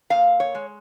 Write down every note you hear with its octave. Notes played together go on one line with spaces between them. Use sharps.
A#2 F5
C#5
G#3